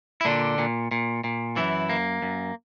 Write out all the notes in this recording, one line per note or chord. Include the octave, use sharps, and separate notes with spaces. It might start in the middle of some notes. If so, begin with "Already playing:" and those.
E4
A#2 D3 D4
A#2
A#2
A#2
F#2 E3 E4
A#3
F#2